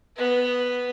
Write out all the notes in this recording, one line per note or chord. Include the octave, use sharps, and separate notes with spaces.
B3 B4